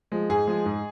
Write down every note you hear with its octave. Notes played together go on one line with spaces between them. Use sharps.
F3 G#3
G#2 G#4
F3 G#3
G#2